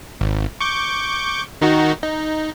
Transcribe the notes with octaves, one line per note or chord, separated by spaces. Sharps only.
G#1
C#6 D6 G6
D#3 D#4 F#4
D#4